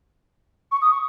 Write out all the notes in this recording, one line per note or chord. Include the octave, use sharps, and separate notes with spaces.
C#6
D#6
C#6